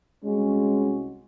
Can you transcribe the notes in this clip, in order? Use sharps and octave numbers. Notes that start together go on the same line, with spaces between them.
C2 G#3 C#4 F#4